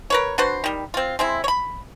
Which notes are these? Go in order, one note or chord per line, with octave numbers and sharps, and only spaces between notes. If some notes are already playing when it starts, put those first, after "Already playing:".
A#4 B4 C#5
D4 F#4 B4 C5
D#3 G3
C4 F4
G#3 C4 E4
C#5 B5